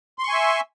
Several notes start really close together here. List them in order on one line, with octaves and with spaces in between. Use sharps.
C6 C#6 G#5 E5